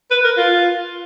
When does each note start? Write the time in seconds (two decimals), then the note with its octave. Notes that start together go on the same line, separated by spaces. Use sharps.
0.11 B4
0.24 A#4
0.37 F4